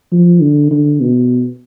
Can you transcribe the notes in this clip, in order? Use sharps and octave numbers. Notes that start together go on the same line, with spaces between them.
F3
D3
D3
B2